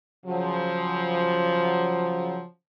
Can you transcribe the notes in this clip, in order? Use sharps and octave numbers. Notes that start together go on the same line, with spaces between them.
C#3 F3 F#3